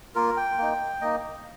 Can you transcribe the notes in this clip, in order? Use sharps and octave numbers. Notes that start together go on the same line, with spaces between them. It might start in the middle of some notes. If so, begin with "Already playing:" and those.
A#3 F4 A#4
G5
A#3 D#4
A#3 D#4 D#5